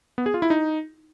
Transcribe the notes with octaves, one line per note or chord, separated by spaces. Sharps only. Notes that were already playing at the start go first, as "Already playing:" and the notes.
B3
G#4
F4
E4
D#4